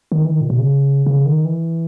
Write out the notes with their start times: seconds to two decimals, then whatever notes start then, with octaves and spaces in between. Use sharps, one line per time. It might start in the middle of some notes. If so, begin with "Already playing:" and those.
0.12 D#3
0.25 E3
0.32 D#3
0.41 A#2
0.50 B2
0.59 C#3
1.06 C#3
1.26 D#3
1.45 E3